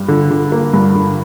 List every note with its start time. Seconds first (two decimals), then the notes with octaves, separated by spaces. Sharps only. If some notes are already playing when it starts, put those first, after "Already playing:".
Already playing: G2
0.08 D3
0.31 D3
0.52 A#3
0.74 G2
0.95 D3